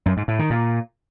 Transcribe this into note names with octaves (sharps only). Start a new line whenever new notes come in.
F#2
G#2
A2
D#3
A#2